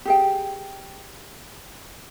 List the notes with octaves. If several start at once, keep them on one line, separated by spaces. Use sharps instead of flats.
G4 G#4 G5